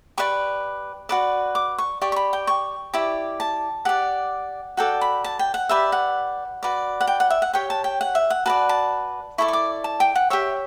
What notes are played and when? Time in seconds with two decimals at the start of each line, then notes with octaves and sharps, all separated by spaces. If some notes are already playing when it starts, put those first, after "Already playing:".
0.18 G4 B4 D5 C#6
1.09 F#4 B4 D5
1.55 D6
1.78 C#6
2.01 G4 D5 C#6
2.12 C#6
2.16 B5
2.33 G5
2.47 C#6
2.94 E4 G4 D5
3.40 A5
3.85 G4 D5 F#5
4.77 F#4 A4 D5 G5
5.01 B5
5.24 A5
5.39 G5
5.54 F#5
5.69 G4 B4 D5 E5
5.92 F#5
6.63 F#4 B4 D5
7.01 F#5
7.07 G5
7.20 F#5
7.30 E5
7.42 F#5
7.54 G4 C#5 G5
7.70 A5
7.84 G5
8.01 F#5
8.15 E5
8.30 F#5
8.46 F#4 B4 D5 A5
8.69 A5
9.38 E4 A4 D5 C#6
9.48 C#6
9.53 D6
9.84 A5
10.00 G5
10.15 F#5
10.30 G4 C#5 E5